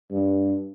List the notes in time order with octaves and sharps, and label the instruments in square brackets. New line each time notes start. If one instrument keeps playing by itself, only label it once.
[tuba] G2